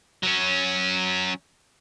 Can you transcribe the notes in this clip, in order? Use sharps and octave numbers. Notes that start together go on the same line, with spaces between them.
F#3 C#4